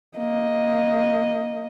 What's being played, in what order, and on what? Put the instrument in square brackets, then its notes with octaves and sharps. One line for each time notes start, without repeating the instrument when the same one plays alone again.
[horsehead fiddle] A#3 D#5